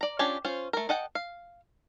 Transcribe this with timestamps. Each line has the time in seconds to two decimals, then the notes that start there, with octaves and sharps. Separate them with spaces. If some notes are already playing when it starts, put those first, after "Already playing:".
0.01 D5 A#5
0.19 C#4 D4 F4 G4 G#5
0.45 C#4 F4 C5
0.73 A3 A#4
0.89 A4 D#5 F#5 G5
1.15 F5